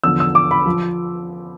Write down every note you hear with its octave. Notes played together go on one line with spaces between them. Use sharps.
E2 D3 F3 E6
E6
D6
B5
F3